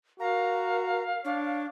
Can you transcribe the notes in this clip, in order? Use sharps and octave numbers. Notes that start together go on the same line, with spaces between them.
F#4 A#4 F5 A#5
D4 C#5